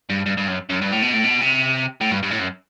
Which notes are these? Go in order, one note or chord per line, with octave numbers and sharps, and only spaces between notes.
G2
G2
G2
F#2
F#2
G2
A2
B2
A2
B2
C3
A2
G2
G2
A2
F#2